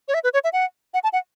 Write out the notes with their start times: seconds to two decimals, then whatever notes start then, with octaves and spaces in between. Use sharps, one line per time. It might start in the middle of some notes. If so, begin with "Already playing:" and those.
0.08 C#5
0.14 E5
0.24 B4
0.34 C#5
0.44 E5
0.53 F#5
0.94 F#5
1.04 A5
1.13 F#5